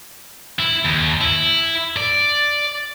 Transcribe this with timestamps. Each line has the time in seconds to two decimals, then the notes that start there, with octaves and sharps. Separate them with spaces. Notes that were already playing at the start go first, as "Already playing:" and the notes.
0.59 E4
0.85 D#2
1.21 E4
1.97 D5